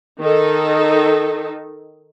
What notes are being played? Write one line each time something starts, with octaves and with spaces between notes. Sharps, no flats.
D#3 D#4 A4